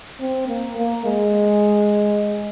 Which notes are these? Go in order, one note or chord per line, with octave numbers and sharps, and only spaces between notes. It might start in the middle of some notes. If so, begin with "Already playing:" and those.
C4
A#3
A#3
G#3